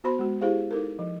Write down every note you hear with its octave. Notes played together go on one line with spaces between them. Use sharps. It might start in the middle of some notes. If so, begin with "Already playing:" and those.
B3 F#4 C5 B5 C6
G#3 F#4
E4 G4 G#4 C5 F5
D#4 A4 A#4
F3